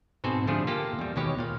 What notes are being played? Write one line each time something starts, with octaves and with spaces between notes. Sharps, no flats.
G#2 B2 C4 A4 C5 G#5
D3 F3 G3 A3 F4 G#4
A#3 F4 G4 A4
E2 G3
D#2 B2 G#3 G4 C#5
A#2 F5